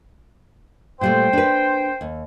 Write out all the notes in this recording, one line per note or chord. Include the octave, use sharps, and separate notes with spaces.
A#2 G3 A3 C5 G5
D4 B4
D#2